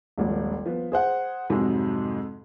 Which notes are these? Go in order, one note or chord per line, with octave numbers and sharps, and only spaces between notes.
D#1 G#1 F3
F3 B3
G#4 C5 F#5
F2 G#2 C3 F#3 G#3